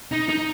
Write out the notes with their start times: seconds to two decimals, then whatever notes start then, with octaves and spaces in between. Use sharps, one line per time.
0.12 D#4
0.28 D#4